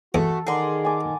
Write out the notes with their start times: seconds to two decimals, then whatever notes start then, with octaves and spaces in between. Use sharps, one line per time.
0.14 E2 A3 F#4 A4
0.47 D#3 G#4 A#4 D5 F#5 C6
0.85 G#5 A5 D6